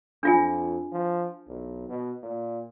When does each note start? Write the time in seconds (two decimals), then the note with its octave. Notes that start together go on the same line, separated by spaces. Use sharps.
0.23 F2 D4 F4 G#5
0.92 F3
1.48 B1
1.89 B2
2.22 A#2